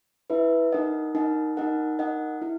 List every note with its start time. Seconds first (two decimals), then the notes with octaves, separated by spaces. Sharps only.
0.30 E4 B4 E5
0.72 D#4 A#4 D#5 F#5
1.15 D#4 A#4 D#5 F#5
1.57 D#4 A#4 D#5 F#5
1.99 D#4 A#4 D#5 F#5
2.42 E4